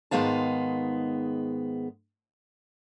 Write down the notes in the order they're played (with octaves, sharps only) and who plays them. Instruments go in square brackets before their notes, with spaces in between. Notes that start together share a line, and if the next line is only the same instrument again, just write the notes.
[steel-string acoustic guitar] G#2 D#3 G#3 B3 F5 A5